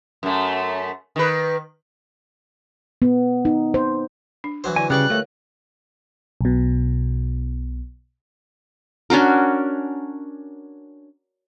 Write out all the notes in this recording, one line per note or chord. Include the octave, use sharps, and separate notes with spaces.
F#2 A3
D#3 B4
B3
D#4
C5
D4
E3 F#3 F#4 C5
D3 E4 D5 G#5
C#3 G3 F#4 B4 D5 G5 C#6 F#6
A3 A#4 C#5 F5
B1 B2
C#4 D4 F#4 A#4